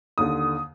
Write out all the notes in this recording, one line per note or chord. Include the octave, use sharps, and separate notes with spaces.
D#2 D3 D#6